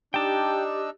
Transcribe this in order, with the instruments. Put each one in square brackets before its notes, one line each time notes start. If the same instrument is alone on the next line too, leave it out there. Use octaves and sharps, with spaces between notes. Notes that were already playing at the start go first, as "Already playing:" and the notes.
[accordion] D4 D#4 E6 [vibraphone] G4 [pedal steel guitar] G5 A5